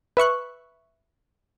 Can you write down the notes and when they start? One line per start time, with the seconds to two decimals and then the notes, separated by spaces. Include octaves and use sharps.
0.17 B4 E5 C#6 F#6